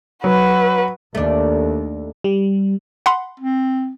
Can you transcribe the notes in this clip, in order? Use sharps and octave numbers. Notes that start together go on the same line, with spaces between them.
F#3 F#4 B4
D#2 A3 D4
G3
F#5 B5 C6
C4